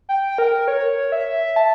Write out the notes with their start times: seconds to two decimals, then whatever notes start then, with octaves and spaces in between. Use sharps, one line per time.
0.09 G5
0.38 A#4
0.68 C#5
1.12 E5
1.56 A5